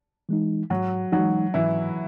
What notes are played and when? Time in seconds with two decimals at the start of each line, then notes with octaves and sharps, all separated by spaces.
0.29 E3 G#3 D#4
0.70 G#2 F#3 F#4
1.12 E3 F#3 G#3 D#4 F#4
1.54 G#2 E3 E4